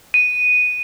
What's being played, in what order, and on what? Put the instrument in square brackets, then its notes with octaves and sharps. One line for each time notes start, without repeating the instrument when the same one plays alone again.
[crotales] D#7